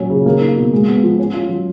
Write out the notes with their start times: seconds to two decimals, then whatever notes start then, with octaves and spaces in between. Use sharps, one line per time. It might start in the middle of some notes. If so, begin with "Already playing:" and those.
Already playing: A#2 F#3 C#4
0.10 C#3
0.26 A#3
0.41 D#4
0.57 B2
0.73 G#3
0.88 B3
1.03 F3
1.19 C#4
1.34 F4
1.49 F#3